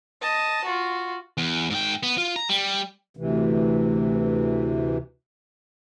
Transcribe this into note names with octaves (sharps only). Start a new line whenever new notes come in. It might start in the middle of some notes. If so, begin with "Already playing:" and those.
D#5 A5
F4 F#4
E2
G#2 G5
B3
F4
A#5
G3
D2 C3 E3